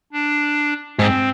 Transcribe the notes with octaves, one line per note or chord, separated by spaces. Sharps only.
D4
G#2 C4